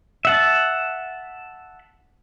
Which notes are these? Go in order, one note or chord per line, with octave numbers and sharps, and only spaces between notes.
E5 F#5 A5